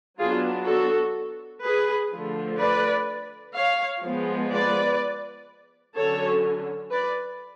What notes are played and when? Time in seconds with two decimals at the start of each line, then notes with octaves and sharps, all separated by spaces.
0.18 F#3 B3 D4 F4 G#4
0.67 F#4 A4
1.63 G#4 B4
2.12 D3 F3 A3
2.59 B4 D5
3.55 C#5 F5
4.03 F3 G#3 B3
4.52 B4 D5
5.96 D3 F#3 C#4 A4 C#5
6.92 B4 D5